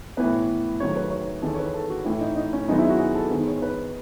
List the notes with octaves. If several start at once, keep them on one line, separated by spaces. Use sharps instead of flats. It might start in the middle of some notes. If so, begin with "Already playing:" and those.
A2 E3 B3 B4
G#2 D#3 F#3 A3 C#5
B4
C#5
E2 D#3 G#3 A4
C#5
B4
A4
F#4
A2 E3 A3 E4
D#4
D#4
C#4
F#2 D#3 G#3 B3 D#4
E4
F#4
G#4
A4
G#2 D#3 G#3 B3
C#5
B4